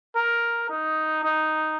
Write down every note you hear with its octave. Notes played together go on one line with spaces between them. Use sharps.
A#4
D#4
D#4